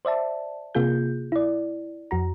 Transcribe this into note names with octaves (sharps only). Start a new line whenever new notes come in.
C5 D5 E5 A5
C3 A#3 F4 G#4 G6
E4 D5
F2 F#4 A#5